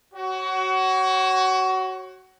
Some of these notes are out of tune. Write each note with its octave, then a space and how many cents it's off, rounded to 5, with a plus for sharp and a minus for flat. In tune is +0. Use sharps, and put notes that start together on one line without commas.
F#4 +25 C#5 -20